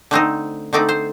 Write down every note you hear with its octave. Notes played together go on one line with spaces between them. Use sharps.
D3 A3 C4 D#4
D3 A3 C4 D#4 D5
C5